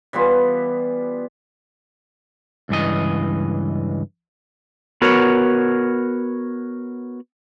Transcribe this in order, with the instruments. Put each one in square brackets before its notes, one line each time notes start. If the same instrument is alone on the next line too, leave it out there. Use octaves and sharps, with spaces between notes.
[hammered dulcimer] E3 G3 B3 F4
[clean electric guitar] C#2 G2 E3 D#5
[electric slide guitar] B3 F#4 A#4 C#5